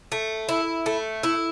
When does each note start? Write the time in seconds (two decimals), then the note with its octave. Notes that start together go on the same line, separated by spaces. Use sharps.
0.12 A3
0.49 E4
0.86 A3
1.23 E4